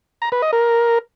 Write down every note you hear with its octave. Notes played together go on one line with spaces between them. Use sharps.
A#5
B4
D#5
A#4